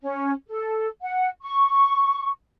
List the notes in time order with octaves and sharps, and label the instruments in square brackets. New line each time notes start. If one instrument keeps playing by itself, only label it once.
[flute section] C#4
A4
F#5
C#6